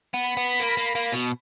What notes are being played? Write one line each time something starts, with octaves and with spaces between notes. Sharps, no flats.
B3
B5
B3
A#3
A#3
A#3
B2